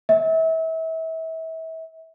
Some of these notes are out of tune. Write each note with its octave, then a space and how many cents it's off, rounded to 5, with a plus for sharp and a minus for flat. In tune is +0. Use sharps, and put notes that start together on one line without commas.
E5 -30